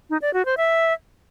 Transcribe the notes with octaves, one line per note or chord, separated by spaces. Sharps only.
D#4
D5
F#4
C5
E5